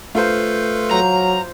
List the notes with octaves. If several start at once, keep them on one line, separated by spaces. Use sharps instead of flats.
A3 F4 A4 B4 C5
F#3 A#5